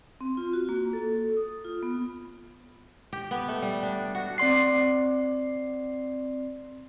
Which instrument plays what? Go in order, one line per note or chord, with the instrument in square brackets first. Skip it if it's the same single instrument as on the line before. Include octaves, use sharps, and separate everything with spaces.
[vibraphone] C4
F4
F#4
A#3
A4
D#6
F4
B3
[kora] G4
B3
A3
G3
D4
F#4
[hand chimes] C4 D5 C6 C7